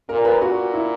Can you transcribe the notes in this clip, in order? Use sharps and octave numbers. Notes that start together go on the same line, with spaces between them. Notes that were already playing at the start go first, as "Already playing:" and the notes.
A#2 A#4
B4
A#2 F#4
E4